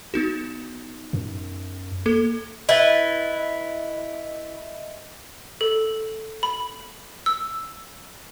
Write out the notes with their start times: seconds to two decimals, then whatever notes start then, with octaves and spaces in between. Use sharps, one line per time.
0.14 B3 D#4 F#4
1.13 F#2
2.06 A#3 A4
2.69 E4 B4 D#5 E5
5.61 A4
6.43 B5
7.26 E6